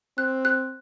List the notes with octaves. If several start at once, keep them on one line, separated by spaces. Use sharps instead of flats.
C4 F#6
F#6